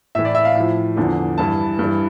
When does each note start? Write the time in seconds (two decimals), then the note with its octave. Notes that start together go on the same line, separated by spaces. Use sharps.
0.15 A2 E3 E5
0.25 D5
0.35 E5
0.45 F5
0.55 A2 F3
0.96 E2 D3 F3
1.38 G2 E3 A5
1.79 G2 E3